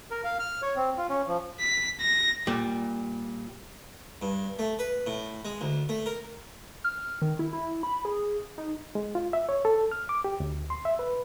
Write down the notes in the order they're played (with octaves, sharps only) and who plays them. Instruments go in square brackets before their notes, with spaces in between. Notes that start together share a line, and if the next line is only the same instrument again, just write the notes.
[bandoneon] A#4
F5
F6
C#5
C4
F4
C#4
F3
[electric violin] B6
A#6
[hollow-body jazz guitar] A#2 G3
[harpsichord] G2
A3
B4
A2
G#3
D2
A3
A#4
[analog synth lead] F6
D#3
E4
E4
B5
G#4
D#4
[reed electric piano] G#3
F4
E5
C#5
A4
F6
D6
G4
D2
C6
E5
B4